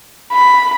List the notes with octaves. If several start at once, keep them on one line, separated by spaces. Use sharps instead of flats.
B5